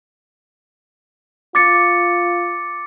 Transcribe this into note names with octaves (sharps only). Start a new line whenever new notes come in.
F4 D6 A6 C#7